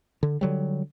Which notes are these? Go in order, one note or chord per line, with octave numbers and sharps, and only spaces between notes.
D3
D3 F#3 G3